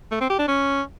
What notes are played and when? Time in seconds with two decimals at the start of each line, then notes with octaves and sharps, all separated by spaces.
0.11 A3
0.21 C4
0.30 G4
0.39 D4
0.48 C#4